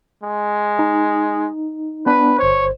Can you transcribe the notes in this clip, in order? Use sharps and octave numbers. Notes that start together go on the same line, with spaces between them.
G#3
D#4
B3 D4 B4
G1 C5 C#5